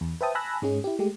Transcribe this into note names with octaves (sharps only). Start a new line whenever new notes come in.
E2
B4 C5 E5 G5 A5 D#6
G#5 A5 B5 E6 F#6 A#6
G#2 G#3 C#4 G#4
E4 G4
G#3 A3 G4